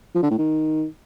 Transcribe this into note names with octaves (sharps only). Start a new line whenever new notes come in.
F3
D3
A2
D#3